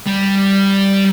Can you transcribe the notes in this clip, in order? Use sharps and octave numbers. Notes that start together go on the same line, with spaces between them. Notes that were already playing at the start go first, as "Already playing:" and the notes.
G3